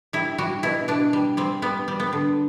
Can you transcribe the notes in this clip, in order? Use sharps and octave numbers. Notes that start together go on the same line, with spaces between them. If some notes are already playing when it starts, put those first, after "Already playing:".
G3 E4
G3 F#4
B2 E4
B2 D4
G3
G3 C4
G3 B3
G3
B3
D3